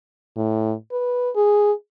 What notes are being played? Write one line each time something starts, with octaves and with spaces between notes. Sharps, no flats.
A2
B4
G#4